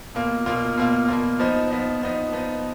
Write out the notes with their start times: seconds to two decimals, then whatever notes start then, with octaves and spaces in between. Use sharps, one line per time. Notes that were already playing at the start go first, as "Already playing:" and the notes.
0.15 B2 A#3 F4
0.46 B2 A#3 F4
0.77 B2 A#3 F4
1.08 B2 A#3 F4
1.39 F3 B3 D#4
1.71 F3 B3 D#4
2.02 F3 B3 D#4
2.33 F3 B3 D#4